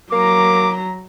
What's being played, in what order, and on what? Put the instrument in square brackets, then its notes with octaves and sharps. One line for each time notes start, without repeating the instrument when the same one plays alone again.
[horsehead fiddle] F#3 A#5 [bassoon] A#3 [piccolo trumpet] D6